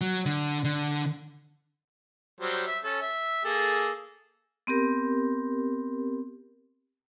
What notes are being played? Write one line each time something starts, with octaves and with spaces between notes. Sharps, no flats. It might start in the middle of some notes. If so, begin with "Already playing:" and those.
F#3
D3
D3
F#3 G3 C5
E5
C#4 A4
E5
A#3 G#4 A4
B3 C4 G4 A#4